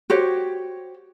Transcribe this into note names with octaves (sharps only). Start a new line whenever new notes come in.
F#4 G4 C5 C#5